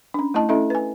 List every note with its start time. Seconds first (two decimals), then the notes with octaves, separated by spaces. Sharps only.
0.14 C#4 D4
0.34 A3 E4 D#5 A5
0.49 A3 C#4 E4 A4 D#5 E5
0.70 B4 G#5